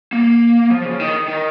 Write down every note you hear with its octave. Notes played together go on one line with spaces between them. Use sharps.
A#3
F3
C#3
D#3
D#3